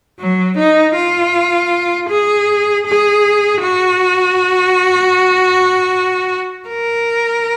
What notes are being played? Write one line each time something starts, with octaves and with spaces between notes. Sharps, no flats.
F#3
D#4
F4
G#4
G#4
F#4
A#4